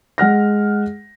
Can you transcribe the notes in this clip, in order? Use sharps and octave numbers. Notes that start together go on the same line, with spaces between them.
G#3 F#5 F6 A#6